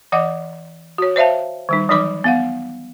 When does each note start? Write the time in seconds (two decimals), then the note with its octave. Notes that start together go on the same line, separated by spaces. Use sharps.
0.12 E3 D#5 F#5 D6
0.98 F#4 C#5
1.16 C5 D5 E5 F5 A5
1.69 D#3 G3 D#4
1.89 E3 F#3 D#4 B5 D6
2.24 B3 F5 F#5